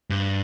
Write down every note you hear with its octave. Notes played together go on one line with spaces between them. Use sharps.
G2